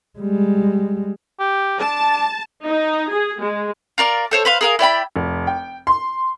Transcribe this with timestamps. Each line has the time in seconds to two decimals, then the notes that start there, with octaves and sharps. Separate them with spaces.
0.19 G3 G#3
1.40 G4
1.80 D4 A5
2.64 D#4
3.08 G#4
3.40 G#3
3.98 F4 A#4 D5
4.31 A4 C5 C#5
4.45 B4 C5 F5
4.61 G#4 A#4 F5
4.79 E4 D5 G5 B5
5.16 F1
5.47 G5
5.87 C6